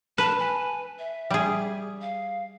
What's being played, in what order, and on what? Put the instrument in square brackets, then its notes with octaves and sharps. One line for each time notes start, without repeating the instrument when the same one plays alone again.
[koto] B4 [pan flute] A5
[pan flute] G#5
E5
[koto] G3 G#4
[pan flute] F5